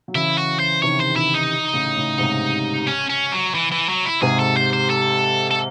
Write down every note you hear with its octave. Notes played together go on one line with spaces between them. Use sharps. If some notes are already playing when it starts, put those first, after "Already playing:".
F#3
C#3 E3 E4
F#4
C5
C3 D#3 C#5
C5
C3 D#3 E4
D#4
A2 C#3
A2 C#3
G#2 C3
C#4
C#4
F#3
E3
E3
F#3
E4
G#2 C3 G#4
A4
C5
C5
A4
A4